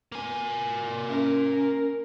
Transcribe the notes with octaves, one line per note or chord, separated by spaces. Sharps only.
A#3 G#5
C#4 A#4